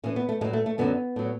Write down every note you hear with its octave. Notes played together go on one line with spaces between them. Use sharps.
A2 E3 C#4
B3
A3
A2 F#3 G#3
A3
A3
F#2 D3 F#3 B3
A2 F#3